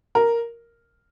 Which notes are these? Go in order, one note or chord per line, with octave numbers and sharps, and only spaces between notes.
A#4